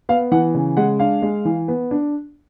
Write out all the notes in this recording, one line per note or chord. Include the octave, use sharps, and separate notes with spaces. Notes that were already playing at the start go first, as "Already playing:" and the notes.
B3 F5
E3 F#5
C#3
G#3 F#5
D4 F5
G#3
E3
B3
D4